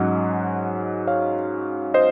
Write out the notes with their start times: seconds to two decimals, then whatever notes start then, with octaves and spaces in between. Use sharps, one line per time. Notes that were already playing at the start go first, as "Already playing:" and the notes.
Already playing: G#2 F#3 C#4 D#5 F#5
1.07 C#5 F5
1.94 C5 D#5